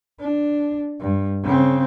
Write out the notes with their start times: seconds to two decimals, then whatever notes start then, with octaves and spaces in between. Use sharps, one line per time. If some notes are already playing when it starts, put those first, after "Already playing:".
0.20 D4
1.00 G2
1.43 C#3 C4